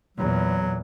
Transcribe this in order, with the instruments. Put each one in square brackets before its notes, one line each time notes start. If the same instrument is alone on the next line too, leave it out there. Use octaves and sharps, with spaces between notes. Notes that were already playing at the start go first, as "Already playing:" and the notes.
[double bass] E2 A#2 [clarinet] F#3